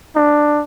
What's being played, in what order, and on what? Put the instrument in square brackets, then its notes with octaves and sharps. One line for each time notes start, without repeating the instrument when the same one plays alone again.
[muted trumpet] D4